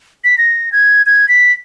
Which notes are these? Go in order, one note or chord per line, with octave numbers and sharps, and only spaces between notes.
B6
A#6
G#6
G#6
B6